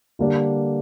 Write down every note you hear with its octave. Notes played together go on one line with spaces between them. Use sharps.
D3 G3 A#3 D4 G4